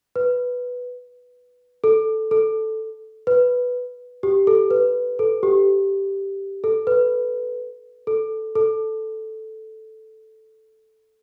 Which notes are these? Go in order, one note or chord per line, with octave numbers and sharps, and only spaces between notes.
B4
A4
A4
B4
G4
A4
B4
A4
G4
A4
B4
A4
A4